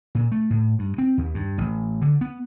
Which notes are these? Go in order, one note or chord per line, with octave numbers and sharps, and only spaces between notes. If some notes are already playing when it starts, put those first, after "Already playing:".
A#2
A3
A2
G2
C4
D#2
G2
A1
D3
B3